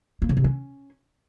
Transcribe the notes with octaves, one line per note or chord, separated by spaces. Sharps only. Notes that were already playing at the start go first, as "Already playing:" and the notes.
A#3
C#3
C3
C#4